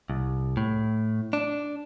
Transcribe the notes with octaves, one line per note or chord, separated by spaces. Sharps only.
C2
A2
D4